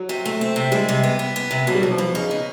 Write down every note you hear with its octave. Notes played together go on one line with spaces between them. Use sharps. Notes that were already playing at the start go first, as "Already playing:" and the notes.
Already playing: F#3
C3
A3
C4
C3
G3 G#3
C3
B3
B3
B3
C3
B2 F#3
G3
B2 F#3
F3
B2
C#3 D#4
B2